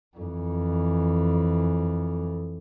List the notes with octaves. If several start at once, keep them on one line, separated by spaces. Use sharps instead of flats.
F2 E3